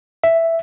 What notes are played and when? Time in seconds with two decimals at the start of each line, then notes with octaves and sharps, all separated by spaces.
0.24 E5